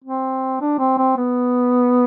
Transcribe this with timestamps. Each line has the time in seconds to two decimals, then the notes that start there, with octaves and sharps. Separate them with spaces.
0.04 C4
0.61 D4
0.79 C4
0.98 C4
1.17 B3